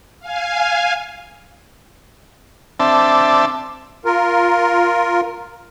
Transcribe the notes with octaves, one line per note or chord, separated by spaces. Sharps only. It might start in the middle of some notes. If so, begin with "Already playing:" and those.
F5 G#5
C4 D4 E5 A5
F4 A#4